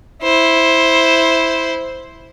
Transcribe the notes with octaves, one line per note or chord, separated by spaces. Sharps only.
E4 C5